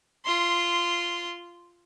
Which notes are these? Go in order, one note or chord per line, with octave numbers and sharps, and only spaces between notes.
F4 C6